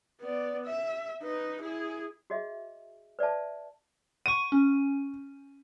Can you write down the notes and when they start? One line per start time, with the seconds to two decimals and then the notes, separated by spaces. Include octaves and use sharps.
0.21 B3 D5
0.64 E5
1.23 D#4 B4
1.61 E4 G#4
2.30 F#4 G#4 D#5 E5
3.19 B4 D5 E5 A5
4.26 F#5 C#6 D#7
4.52 C#4